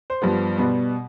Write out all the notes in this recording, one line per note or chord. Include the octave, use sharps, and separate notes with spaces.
C5
G2 F3 B3
B2 G3 B3